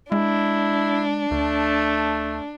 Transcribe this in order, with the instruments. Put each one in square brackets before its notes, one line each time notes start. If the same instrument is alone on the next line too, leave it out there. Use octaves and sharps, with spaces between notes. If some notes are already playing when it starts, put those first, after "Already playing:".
[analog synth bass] G#3 [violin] D4 [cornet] E4
[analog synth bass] D2 [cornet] A3